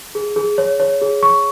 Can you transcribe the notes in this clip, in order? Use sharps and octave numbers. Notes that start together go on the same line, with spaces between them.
G#4
G#4
C#5
C#5
G#4
C#6